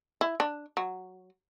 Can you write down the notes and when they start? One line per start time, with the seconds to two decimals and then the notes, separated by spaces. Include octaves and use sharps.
0.21 E4
0.40 D4
0.77 F#3